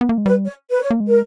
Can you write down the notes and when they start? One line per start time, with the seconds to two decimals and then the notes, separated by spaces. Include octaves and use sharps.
0.01 B3
0.09 A#3
0.18 G#3
0.26 G3 B4
0.45 C#5
0.70 B4
0.82 C#5
0.91 A#3
1.00 G#3
1.07 A#4